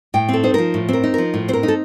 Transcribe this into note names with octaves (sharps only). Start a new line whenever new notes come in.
A2 G5
C4 A4
D#4 C5
F3 A#4
A2
C4 A#4
D#4
F3 A#4
A2
C4 C5
A#4
D#4
A4